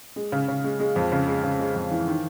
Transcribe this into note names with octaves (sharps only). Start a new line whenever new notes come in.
G#3
C#3
C#3
G#3
G#3
F2
C#3
G#3
C#3
G#3
F2
E3
D#3